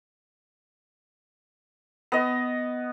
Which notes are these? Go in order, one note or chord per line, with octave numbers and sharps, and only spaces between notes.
B3 D#5